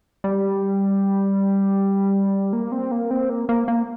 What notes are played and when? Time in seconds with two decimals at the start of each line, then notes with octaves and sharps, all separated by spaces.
0.24 G3
2.53 A#3
2.72 C4
2.91 A#3
3.11 C4
3.30 A#3
3.49 A#3
3.68 A#3